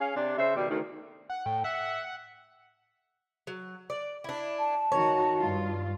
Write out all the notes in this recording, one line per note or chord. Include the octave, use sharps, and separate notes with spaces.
C#4 G#4 F5
C3 D4
C#3 C5 E5
B2 D#3 G3
D2 D#3
F#5
A2 G5
E5 F#5
F#3
D5
D4 E4
A5
D#3 F#4 C#5
G2 F4